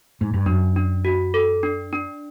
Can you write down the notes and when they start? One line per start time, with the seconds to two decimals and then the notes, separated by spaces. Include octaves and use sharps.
0.21 G#2
0.34 G2
0.46 F#2 D4
0.76 D4
1.05 F#4
1.34 A4
1.63 D4
1.93 D4